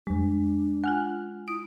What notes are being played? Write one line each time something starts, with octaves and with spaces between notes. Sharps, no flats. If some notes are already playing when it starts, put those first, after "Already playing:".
F2 G3 G#3 D4
F4 F#5 G#5 F6 F#6
E4 D#6 D7